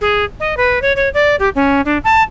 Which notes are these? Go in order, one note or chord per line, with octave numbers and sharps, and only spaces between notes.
G#4
D#5
B4
C#5
C#5
D5
G4
C#4
D4
A5